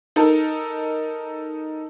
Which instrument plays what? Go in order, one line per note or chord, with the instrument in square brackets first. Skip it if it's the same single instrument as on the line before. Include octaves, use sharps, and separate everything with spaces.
[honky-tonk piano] D#4 A4 A#4